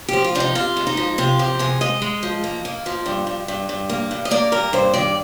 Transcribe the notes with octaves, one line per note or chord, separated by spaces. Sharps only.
F3 G4
F4
C3 D4
D#4
C3 F4
G#3
D#4
F3
C3 F4
F3 G4
C3 G#4
G#3 D#5
G#3
F3
A#3
A#3
F3
G2
G2
G2
G2
A#3
G2
D#5
A#3 D5
G2 A#4
G2 C5
D#3 D5